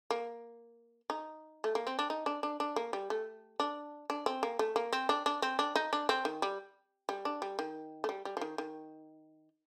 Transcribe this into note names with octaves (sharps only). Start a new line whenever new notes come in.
A#3
D#4
A3
A#3
C4
D4
D#4
D4
D4
D4
A#3
G3
A3
D4
D4
C4
A#3
A3
A#3
C4
D4
D4
C4
D4
D#4
D4
C4
D#3
G3
G3
D4
G3
D#3
A3
G3
G3
F3
D#3
D#3